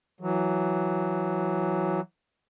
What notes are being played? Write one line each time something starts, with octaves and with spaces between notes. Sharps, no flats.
E3 F#3